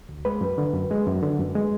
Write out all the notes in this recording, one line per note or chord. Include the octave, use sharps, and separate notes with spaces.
D2
G#3 B4
F#2
D3
F#2
G#3
F#2
D3
F#2
G#3